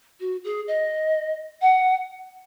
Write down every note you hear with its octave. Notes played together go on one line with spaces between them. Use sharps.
F#4
G#4
D#5
F#5